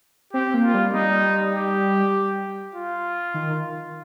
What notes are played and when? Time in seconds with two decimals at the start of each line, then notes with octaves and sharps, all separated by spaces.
0.33 C4 G4
0.54 A#3
0.64 F4
0.74 G3
0.94 G3 D#4
1.55 G4
2.75 F4
3.34 D#3